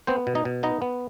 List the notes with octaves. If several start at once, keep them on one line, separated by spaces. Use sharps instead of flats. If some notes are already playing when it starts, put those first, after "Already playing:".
B3 C4 C5
B2
D#4 D#5
B2
B3 D#4 D#5
B3